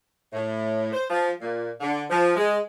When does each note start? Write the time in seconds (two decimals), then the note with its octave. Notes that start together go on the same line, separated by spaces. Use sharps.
0.33 A2
0.93 C5
1.10 F3
1.41 A#2
1.81 D3
2.10 F3
2.36 G#3